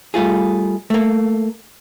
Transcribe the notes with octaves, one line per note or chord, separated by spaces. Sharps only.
G3 A3 F4 G#4
A3 A#3